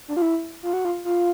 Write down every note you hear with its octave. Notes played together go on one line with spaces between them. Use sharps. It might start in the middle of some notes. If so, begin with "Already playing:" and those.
D4
F4
E4
F4
F#4
F4
F4